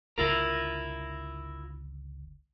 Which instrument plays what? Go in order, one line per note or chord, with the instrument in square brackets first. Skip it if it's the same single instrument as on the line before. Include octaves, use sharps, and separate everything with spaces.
[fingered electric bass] G1 C#2 D3 [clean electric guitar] E4 F4 A#4